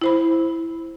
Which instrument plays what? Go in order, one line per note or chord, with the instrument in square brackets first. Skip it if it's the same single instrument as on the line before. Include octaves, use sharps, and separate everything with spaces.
[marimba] E4 C5 B5